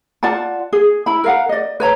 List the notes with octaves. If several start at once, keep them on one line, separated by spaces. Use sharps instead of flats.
F4 D5 F#5 A5
G#4
E4 B5
A#4 F5 F#5
D5 D#5
B4 C#5 A#5